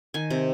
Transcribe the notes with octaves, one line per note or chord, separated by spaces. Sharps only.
D#3 G#5
C3